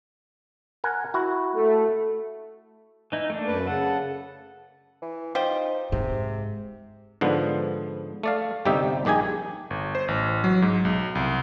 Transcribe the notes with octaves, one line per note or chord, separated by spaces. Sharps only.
A#4 F#5 G#5
E4 F#4
A3
E3 D#4 E4
A3 A#3 D4
F#2 B4
C#3 A4 F#5
E3
D#4 F4 G4 C5
G#2 C3
G#2 D3 F3 B3
A3 D5 F5
G1 C3 G3 D#4 G4 E5
A#1 D#3 G4 G#4 G#5
G1
C5
A1
F#3
G#2
B1
C2